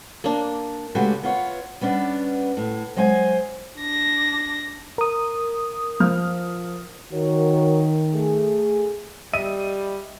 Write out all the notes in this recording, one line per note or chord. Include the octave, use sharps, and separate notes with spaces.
A#3 D4
C#3 G#3 A3 F#4 G4 B4
B3 F4 C#5
G3 B3 C#4 D4
A2
F#3 G#3 C5 F#5 G#5
D4 A#6
A#4 D#6
F3 F6
D#3 F#4 A#4 C#5
A3 G#4
G3 D#5 E5 D#7